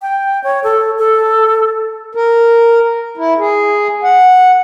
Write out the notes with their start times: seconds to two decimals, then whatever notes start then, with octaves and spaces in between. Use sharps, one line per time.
0.02 G5
0.44 C#5
0.64 A4
0.98 A4
2.15 A#4
3.17 E4
3.38 G#4
4.03 F#5